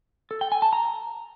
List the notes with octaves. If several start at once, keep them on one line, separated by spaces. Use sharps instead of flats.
A4
G5
G#5
A5
A#5